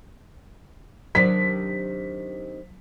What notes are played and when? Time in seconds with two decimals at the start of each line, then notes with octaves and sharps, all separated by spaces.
1.15 C3 D#3 F#3 D4 B6